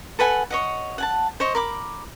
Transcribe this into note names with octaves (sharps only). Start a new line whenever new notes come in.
A4 B4 F#5 G#5
C#5 D#5 F#5
F#5 G#5 A5
C5 C#5 D#5
A#4 B5 D6